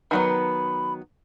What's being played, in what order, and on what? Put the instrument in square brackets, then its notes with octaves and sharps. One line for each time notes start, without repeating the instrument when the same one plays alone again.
[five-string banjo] D#3 F#3 B3 [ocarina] B5